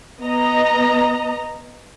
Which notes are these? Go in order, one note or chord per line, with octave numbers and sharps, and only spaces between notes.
B3 D#5 A#5